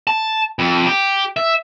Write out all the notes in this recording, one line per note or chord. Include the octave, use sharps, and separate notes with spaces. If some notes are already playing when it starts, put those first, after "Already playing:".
A5
F2
G4
E5